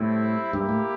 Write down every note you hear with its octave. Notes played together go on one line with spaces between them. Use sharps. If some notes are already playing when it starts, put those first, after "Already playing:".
Already playing: A2 G3 C4 E4
G2 A#3 E4 G4
A2